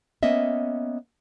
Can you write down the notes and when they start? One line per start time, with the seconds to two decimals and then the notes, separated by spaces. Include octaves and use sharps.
0.23 A#3 B3 C#4 D#5 E5